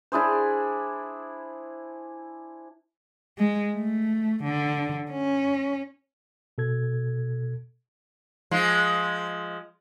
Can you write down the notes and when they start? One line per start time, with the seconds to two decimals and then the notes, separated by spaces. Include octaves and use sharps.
0.12 D4 E4 G#4 C5
3.38 G#3
3.74 A3
4.44 D3
5.11 C#4
6.58 B2 A4 G#6
8.51 F3 G#3